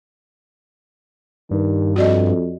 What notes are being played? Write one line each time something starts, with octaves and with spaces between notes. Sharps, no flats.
G2 D#3
F2 F#4 D5 D#5